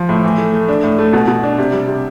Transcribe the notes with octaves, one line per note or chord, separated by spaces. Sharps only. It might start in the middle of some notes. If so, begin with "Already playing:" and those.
Already playing: F3
A2
E3
A3
A3
D4
A2
A3
B2
B2
D4
C3
G3
C3